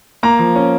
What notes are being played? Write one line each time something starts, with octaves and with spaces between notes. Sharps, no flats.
A#3 A#5
F3
C#4